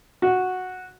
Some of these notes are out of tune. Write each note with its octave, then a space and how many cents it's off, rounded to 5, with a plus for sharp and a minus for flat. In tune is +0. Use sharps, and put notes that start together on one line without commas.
F#4 -5